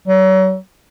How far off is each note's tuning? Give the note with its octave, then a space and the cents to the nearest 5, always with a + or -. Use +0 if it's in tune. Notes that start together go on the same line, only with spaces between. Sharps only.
F#3 +35